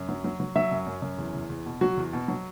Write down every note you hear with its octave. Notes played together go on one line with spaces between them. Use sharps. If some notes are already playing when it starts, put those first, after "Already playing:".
Already playing: F#2
F#3
F#3
F#3
F#3 E5
F#2
F#2
F#2
E2
E2
E2
B2
F#3 F#4
E2
B2
F#3